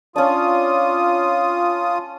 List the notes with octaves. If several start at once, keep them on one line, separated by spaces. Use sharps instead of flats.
C#4 D4 F4 D#6